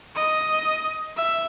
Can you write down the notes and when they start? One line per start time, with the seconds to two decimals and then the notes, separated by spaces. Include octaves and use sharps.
0.15 D#5
1.17 E5